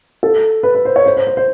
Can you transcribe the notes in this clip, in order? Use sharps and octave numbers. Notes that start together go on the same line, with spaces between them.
A4
B4
B4
C5
C#5
C5
C5
C5
C5